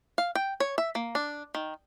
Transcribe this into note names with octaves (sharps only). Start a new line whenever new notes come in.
F5
G5
C#5
E5
A#3
D4
D#3